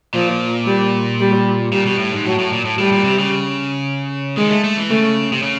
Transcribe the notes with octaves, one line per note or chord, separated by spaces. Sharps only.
A#2 F3
G3
G3
A#2 G3
B2
A2
G#2
A2 F#3
A2
A#2
A2
A2 G3
A#2
C3
C#3
D#3 G#3
A3
A3
E3
C#3 A3
C3
C#3